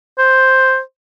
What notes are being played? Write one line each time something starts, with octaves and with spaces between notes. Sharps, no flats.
C5